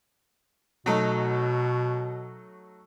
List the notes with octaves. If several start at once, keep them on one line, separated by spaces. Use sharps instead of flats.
B2 F#3 A3 D#4